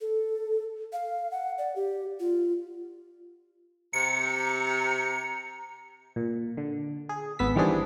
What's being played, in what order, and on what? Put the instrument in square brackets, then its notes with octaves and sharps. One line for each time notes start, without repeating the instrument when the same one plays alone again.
[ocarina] A4
F5
F#5
D5
G4
F4
[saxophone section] C3 [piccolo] A#5 [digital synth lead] C#7
[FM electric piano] A#2
D3
G#4
G#1 B3 E6 B6
D#3 E3 G3 C4 D4 G#4